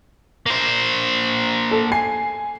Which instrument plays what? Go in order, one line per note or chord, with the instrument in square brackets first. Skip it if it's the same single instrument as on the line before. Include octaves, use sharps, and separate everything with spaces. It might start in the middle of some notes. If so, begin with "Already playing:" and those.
[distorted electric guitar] A#3 C5
[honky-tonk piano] A4
G#5 C7